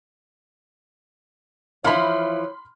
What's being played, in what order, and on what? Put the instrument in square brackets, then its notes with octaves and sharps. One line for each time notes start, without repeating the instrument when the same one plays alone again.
[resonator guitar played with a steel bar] E3 F3 [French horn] C#5 [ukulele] E5 F5 [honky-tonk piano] B5 C6 F6